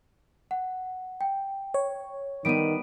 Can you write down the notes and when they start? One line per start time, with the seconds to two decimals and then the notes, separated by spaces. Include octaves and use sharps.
0.51 F#5
1.21 G5
1.74 C#5
2.45 D#3 G3 B3 D7 D#7